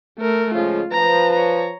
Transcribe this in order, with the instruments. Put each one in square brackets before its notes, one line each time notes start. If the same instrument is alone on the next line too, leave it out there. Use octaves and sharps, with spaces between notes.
[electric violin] A3 A#4
[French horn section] C#3 F3 G#3 [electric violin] F4
[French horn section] F3 B4 [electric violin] A#5
[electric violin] C#5 A#5